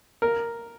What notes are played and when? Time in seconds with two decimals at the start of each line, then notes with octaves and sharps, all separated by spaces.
0.22 A#4